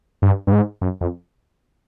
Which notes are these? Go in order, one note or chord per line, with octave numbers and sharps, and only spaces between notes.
G2
G2
G#2
F#2
F2